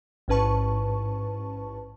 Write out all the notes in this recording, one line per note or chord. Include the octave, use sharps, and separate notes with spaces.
A1 G#2 C#4 B4 A5 C#6